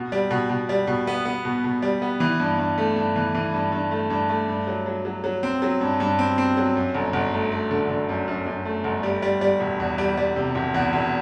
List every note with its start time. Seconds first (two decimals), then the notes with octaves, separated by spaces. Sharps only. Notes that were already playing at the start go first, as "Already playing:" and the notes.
Already playing: B2
0.12 G3
0.31 B2
0.49 B2
0.69 G3
0.87 B2
1.07 B3
1.25 B3
1.45 B2
1.64 B2
1.82 G3
2.02 B3
2.20 E3
2.40 G2
2.58 G2
2.78 A3
2.96 G2
3.16 E3
3.35 E3
3.54 G2
3.72 G2
3.91 A3
4.10 G2
4.29 A3
4.48 G2
4.67 F#3
4.86 F#3
5.05 F#3
5.24 F#3
5.43 C4
5.62 F#3
5.81 G2
6.00 G2
6.19 C4
6.38 C4
6.57 F#3
6.76 F#2
6.95 G1
7.13 G1
7.33 A3
7.52 A3
7.71 D3
7.89 D3
8.09 F#2
8.28 F#2
8.46 F#2
8.65 A3
8.84 G1
9.03 G3
9.22 G3
9.41 G3
9.60 E1
9.80 E2
9.98 G3
10.17 G3
10.36 C3
10.55 E1
10.74 E2
10.93 E1